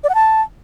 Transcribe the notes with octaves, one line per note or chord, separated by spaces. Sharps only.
D5
F#5
A5